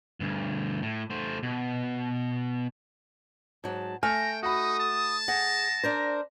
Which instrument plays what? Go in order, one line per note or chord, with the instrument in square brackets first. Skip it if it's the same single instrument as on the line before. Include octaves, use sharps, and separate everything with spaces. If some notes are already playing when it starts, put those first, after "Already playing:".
[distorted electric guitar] D2 G2
A2
A3 C5
B2
[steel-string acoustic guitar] G#2 F#3 [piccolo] A5
[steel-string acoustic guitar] A3 [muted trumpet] G5 [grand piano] G#5 F6 [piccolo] A#6
[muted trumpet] D#4 [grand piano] F#4 B5 [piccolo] D#6
[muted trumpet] A5
[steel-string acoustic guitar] G#4 [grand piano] F#5 [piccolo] A#6
[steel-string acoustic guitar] D4 A#4 C5